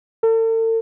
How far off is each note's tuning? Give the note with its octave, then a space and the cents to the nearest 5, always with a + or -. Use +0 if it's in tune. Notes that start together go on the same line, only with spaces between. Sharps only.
A4 +40